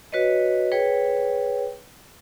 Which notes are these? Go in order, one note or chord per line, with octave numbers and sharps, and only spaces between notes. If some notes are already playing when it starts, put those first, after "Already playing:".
F#4 B4 C#5 D#5
G#4 B4 C#5 G5